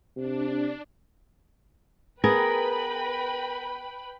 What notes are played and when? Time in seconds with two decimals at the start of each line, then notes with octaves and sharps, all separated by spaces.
0.16 C3 D4
2.24 B3 G#4 A#4 B4 G5 B5